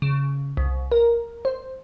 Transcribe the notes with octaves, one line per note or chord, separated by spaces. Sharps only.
C#3
C2
A#4
C5